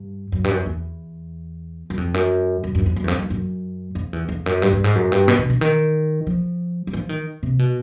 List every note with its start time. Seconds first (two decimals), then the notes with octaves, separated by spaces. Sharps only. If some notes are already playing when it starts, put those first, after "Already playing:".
Already playing: G2
0.32 F#2
0.44 G2
0.50 F#2
0.66 E2
1.90 F#2
1.97 F2
2.14 F#2
2.64 F#2
2.75 F#2
2.86 F2
2.96 F#2
3.04 E2
3.08 F2
3.18 F#2
3.30 F#2
3.95 F2
4.13 E2
4.29 F2
4.46 F#2
4.62 G2
4.73 G2
4.84 G#2
4.95 F#2
5.12 G2
5.28 B2
5.39 B2
5.50 D3
5.61 D#3
6.27 F3
6.87 F#3
6.93 F3
7.09 D#3
7.43 C3
7.59 B2